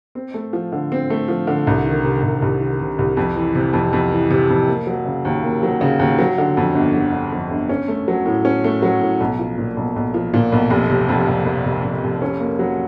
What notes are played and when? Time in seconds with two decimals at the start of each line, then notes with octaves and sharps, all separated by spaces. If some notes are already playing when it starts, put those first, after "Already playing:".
0.15 C4
0.34 A3
0.53 F3
0.72 D3
0.92 C4
1.10 A3
1.28 F3
1.47 D3
1.67 C2
1.85 D#3
2.04 C3
2.23 C2
2.42 C2
2.61 D#3
2.80 C3
2.99 C2
3.17 F2
3.36 E3
3.55 C3
3.73 F2
3.93 F2
4.11 E3
4.30 C3
4.50 F2
4.67 A#3
4.87 F#3
5.06 C#3
5.25 D#2
5.43 A#3
5.63 F#3
5.81 C#3
5.99 D#2
6.19 F#3
6.38 D3
6.57 F2
6.75 G1
6.95 F#3
7.12 D3
7.32 F2
7.51 G1
7.69 C#4
7.88 A3
8.08 F#3
8.25 A2
8.45 C#4
8.64 A3
8.82 F#3
9.01 A2
9.20 B1
9.39 F3
9.58 A#2
9.77 B1
9.96 B1
10.14 F3
10.34 A#2
10.52 B1
10.70 F1
10.90 C3
11.09 F2
11.28 F1
11.46 F1
11.65 C3
11.84 F2
12.03 F1
12.22 C#4
12.40 A#3
12.59 F#3